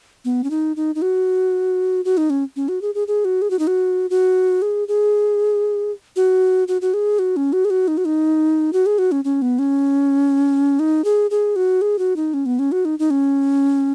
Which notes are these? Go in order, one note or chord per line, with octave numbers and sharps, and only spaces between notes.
B3
C#4
D#4
D#4
D#4
F#4
F#4
D#4
C#4
C#4
F#4
G#4
G#4
G#4
F#4
G#4
F#4
D#4
F#4
F#4
G#4
G#4
F#4
F#4
F#4
G#4
F#4
C#4
F#4
G#4
F#4
D#4
F#4
D#4
F#4
G#4
F#4
C#4
C#4
B3
C#4
D#4
G#4
G#4
F#4
G#4
F#4
D#4
C#4
B3
C#4
F#4
D#4
D#4
C#4